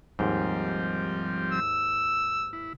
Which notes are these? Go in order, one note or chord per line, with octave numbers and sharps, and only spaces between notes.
D#2 G#2 F3 G3 C4
E6
E4